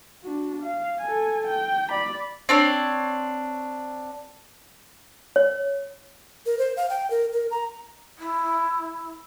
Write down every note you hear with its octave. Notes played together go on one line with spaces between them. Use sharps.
D4 F#4
F5
A4 G#5
G5
D5 B5
C4 D4 C#5
C#5
A#4
C5
F5
G5
A#4
A#4
A#5
E4